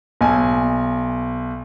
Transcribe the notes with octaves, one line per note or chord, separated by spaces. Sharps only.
B1 G#5